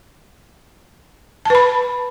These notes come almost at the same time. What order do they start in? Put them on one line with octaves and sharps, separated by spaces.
A5 B4 B5